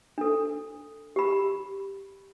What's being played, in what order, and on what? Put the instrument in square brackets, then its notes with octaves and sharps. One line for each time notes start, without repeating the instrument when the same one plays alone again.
[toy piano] D4 A4
G4 B5